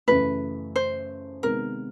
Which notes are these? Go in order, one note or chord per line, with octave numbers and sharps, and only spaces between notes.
F#2 C#3 E3 A3 B4
C5
C3 D#3 G#3 B3 A#4